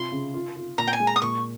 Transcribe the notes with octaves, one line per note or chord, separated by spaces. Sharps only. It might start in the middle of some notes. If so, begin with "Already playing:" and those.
Already playing: C3 F4 C6
C#3
F4
F4
A#2 A#5
G5
G#5
G#3
A#5
D#6
A#2 C#6